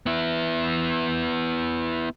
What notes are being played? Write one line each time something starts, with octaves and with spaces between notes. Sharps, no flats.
B3 E4